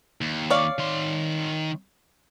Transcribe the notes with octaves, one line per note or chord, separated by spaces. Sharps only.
D#2
C#5 D5 F5
D#3 C6